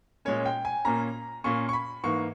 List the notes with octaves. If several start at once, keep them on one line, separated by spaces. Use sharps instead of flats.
A#2 G#3 C#4 C#5
G5
G#5
A#2 A#3 C#4 A#5
A#2 A#3 C#4 C#6
C#6
B5
G#2 E3 A#3 C#6